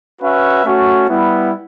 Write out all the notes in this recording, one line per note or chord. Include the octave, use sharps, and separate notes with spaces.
C#4 F#4 B4 E5
A3 C#4 F#4
G3 B3 E4